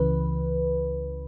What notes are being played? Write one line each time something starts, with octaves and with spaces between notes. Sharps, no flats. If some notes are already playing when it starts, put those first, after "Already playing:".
Already playing: C#2 C#3 E3 B4